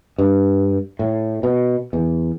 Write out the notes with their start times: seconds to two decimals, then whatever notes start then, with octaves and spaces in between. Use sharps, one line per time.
0.18 G2
0.99 A2
1.43 B2
1.93 E2